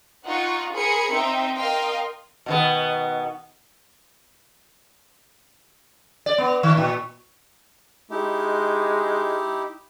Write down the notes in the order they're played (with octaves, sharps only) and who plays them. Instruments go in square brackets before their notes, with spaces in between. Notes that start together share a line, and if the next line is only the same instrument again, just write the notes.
[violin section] D#4 F4 F#5 C#6
G#4 A#4 C5 G#5 B5 C#7
C4 D#4 C5 E5 G5
A#4 D#5 F5 G5 C6
[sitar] B2 D#3 B3
D5
B3
D#3
A#2
[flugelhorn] G#3 [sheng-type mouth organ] D#4 E4 G4